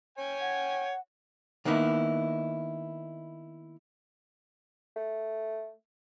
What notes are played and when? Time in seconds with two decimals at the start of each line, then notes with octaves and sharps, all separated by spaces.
0.18 C#5 G5 G#5
0.41 F#5
1.65 D#3 A#3 B3 D#4 E4
4.96 A3